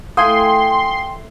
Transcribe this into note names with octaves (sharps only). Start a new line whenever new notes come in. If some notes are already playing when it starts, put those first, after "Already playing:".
A3 E4 A4 F5 G5 G#5 C6 D#6